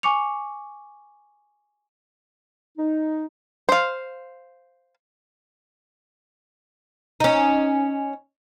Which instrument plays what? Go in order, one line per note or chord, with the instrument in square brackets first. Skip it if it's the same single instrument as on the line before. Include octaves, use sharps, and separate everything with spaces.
[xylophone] G#5 C#6 D6 C#7 F7
[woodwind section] D#4
[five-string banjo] C5 F5
[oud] C#4 D#4